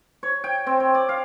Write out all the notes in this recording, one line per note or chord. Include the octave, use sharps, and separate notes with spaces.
C#5
G5
C4
C#5
D5
F5